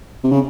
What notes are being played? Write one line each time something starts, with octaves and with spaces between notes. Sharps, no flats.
C3
C#3